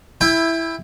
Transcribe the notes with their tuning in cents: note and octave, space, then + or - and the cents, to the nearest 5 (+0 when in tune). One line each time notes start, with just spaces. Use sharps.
E4 +0 G5 +30